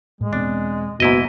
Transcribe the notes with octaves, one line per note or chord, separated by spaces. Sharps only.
A2 G#3
E1 B3 C4 D4
F#1 G#2 B2 A#3 E4 D#5